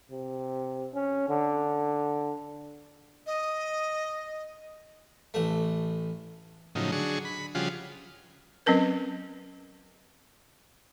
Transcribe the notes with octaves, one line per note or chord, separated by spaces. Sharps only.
C3
C#4
D3
D#5
A1 A3
A2 C#3 F3 F#3 D#4
D3 F#3 G#4 C#6
B5
C#3 F3 G3 F4 F#4 G#4
F#3 C4 C#4 A#4 B4